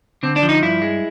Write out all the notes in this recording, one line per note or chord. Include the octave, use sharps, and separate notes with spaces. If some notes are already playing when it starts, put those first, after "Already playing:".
D3 C4
D4
F3
D#4
G2 E4
G#3